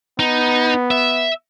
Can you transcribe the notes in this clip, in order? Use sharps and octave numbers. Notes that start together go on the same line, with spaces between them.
B3 D#4
E5